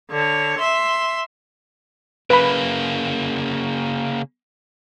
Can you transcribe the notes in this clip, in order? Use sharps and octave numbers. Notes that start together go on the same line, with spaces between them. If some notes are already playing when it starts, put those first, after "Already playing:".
D3 C#5
E5 C6
C#3 A#3 B4 B5